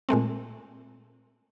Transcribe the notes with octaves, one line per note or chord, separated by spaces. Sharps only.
A#2 G#3 A3 C4